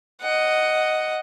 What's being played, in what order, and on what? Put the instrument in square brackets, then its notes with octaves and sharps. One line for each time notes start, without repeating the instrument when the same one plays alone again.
[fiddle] D#5 F#5